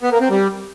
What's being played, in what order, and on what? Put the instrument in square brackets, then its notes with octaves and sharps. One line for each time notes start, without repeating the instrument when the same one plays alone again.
[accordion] B3
A#3
C4
G3